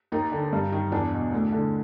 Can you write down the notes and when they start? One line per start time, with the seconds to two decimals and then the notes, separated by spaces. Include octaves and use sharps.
0.12 D#2 D#4
0.32 D3
0.53 G2
0.72 D#3
0.92 E2 D4
1.12 B2
1.33 D2
1.52 D3